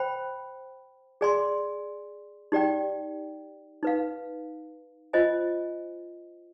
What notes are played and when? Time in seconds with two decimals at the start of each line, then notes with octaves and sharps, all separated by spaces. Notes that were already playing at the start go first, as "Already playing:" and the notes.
Already playing: C5 G5 B5
1.21 G#4 D5 G#5 C6
2.52 D#4 G4 D5 G5
3.83 D#4 B4 F5
5.13 F4 C5 D#5 G#5